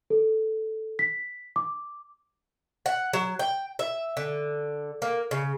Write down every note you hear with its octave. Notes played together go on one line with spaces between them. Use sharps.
A4
B6
D6
F#5
F#3
G5
E5
D3
A#3
C#3